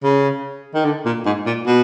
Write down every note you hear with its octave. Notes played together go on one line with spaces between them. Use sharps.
C#3
D#3
D3
A#2
G#2
A#2
B2